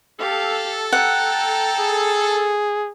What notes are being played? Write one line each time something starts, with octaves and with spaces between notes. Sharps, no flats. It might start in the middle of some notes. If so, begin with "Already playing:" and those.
G4 A4 F5
F#5 G5 A#5
G#4